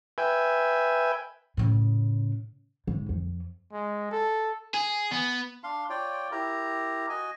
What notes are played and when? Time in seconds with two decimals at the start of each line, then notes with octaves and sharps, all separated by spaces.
0.18 B4 E5 G5 G#5
1.57 A2 C#3
2.87 G#2
3.09 F2
3.73 G#3
4.12 A4
4.74 G#4
5.12 B3
5.64 D4 F5 C6
5.90 F4 C#5 D5 G5
6.32 E4 G4 A#4 A#5
7.09 F#4 D#5 G#5